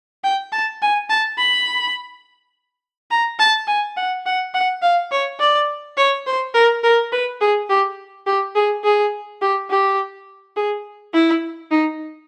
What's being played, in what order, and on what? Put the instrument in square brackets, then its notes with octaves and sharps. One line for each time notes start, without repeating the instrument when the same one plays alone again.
[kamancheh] G5
A5
G#5
A5
B5
A#5
A5
G#5
F#5
F#5
F#5
F5
C#5
D5
C#5
C5
A#4
A#4
B4
G#4
G4
G4
G#4
G#4
G4
G4
G#4
E4
D#4